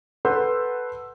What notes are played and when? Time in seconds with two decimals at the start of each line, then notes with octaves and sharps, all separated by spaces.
0.25 A4 B4 F#5 C6 E6 G6